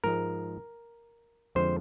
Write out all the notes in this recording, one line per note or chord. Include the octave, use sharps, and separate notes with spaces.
G#2 F3 G#3 A#4
F2 D3 F3 G#3 C5